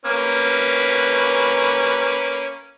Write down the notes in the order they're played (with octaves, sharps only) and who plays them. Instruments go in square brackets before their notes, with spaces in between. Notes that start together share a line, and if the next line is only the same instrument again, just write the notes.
[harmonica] A#3 C#4 B4